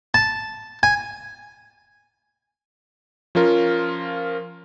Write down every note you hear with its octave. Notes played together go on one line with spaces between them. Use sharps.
A5
G#5
F3 C#4 F4 A#4